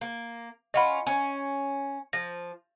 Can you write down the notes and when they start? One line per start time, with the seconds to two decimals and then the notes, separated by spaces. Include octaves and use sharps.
0.01 A#3
0.74 C#4 F4 D#5 F#5 B5
1.07 C#4
2.13 F3 A#6